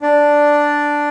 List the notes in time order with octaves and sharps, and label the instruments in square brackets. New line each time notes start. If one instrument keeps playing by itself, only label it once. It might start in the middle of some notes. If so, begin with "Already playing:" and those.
[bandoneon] D4 D5